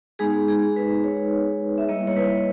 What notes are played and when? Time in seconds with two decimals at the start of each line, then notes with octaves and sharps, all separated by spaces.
0.19 G#3 B3 D#4 G#4
0.48 G#4
0.76 B4
1.04 C#5
1.78 E5
1.88 G3 A#3 E4 D#5
2.07 C#5
2.16 B4